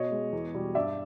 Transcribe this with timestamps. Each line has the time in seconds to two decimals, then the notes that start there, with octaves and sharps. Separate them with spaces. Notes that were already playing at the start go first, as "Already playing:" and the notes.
Already playing: B2 C#5 D#5
0.11 G#3
0.32 E2
0.54 B2 G3
0.75 G2 D5 E5